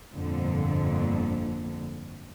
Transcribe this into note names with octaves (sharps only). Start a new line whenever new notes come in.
G1 F2 A#2 D3